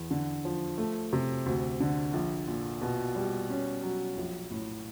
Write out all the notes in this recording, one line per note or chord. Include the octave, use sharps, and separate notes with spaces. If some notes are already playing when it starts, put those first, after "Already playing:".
Already playing: E2
D3
F3
A3
C3
D2
D3
A#1
A#2
B2
G3
C#4
F#3
A#1
A2